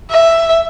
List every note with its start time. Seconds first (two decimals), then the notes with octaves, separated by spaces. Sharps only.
0.10 E5